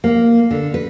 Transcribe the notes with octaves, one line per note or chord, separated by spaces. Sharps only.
A#3
D3
B4